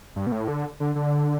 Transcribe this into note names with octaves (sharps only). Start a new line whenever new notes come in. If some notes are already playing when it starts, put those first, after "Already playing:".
G2
B2
A2
D3
D3
D3